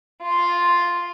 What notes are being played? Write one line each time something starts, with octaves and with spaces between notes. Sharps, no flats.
F4